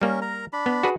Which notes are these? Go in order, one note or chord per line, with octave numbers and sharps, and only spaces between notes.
G3 A#3 C#4 A#4
A#4 A#5
D4 B5
B3
F#4 G#4 B4